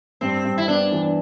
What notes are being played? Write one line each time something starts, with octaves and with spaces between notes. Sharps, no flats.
G2 C4
G2
E4
B3 D4
E3